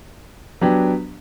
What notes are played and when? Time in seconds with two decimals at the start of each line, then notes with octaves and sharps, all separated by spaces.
0.61 F#3 B3 D4 G4